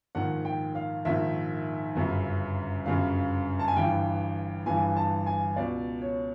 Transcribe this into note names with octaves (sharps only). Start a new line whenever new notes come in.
A#1 G#2 D#3 F#5
G5
F5
A#1 G#2 D#3 E5
G1 F#2 C#3
G1 F#2 C#3 F5
A5
G#5
G1 G2 E3 G5
G1 G2 E3 G#5
A5
G#5
C#2 B2 D5
C#5